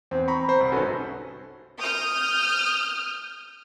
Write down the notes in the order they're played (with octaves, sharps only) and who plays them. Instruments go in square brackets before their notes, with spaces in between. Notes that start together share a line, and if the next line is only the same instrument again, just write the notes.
[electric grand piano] E2 [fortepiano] C4
[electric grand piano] A#5 B5 C#6
C5 B5
C2
[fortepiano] G#1 C#4 [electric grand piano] F#4 A4 B4
[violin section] D#6 F6 G6